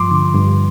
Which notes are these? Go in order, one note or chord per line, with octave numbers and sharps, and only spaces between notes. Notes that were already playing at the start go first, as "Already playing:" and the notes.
Already playing: G2 F3 C6 D6
D3
G2